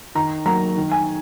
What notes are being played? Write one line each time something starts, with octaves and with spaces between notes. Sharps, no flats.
D#3 A#5
F#3 A#3 A#5
D#3
G#5